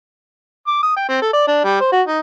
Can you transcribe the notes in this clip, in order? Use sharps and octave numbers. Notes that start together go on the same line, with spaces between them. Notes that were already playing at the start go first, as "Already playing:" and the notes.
D6
D#6
G5
C4
A4
D5
D4
G3
C5
F#4
D#4